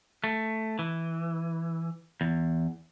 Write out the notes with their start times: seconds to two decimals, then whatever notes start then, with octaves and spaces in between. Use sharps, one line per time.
0.24 A3
0.79 E3
2.21 E2